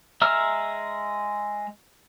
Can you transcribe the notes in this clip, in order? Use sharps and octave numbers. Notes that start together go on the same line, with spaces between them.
G#3 E5 A#5 E6 F6